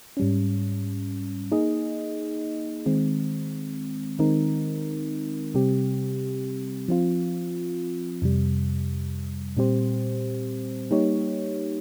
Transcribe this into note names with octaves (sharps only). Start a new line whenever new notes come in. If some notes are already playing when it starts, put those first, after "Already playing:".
G#2 G3 C#4
A#3 D#4 G#4 D#5
D#3 G#3 C4
D#3 G#3 C4 D#4 A#4
C3 G3 C4 G4
F3 C4 F4
F2 C3 G3
A#2 G3 C4 G4 C5
G3 A#3 D#4 G4 C#5